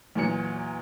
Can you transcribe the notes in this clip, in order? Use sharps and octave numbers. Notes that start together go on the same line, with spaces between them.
E2 A#2 F#3 C#7